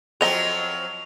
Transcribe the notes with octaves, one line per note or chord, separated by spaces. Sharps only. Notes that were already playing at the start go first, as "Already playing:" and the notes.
F3 F#3 C4 A4 D#5 A#5 F7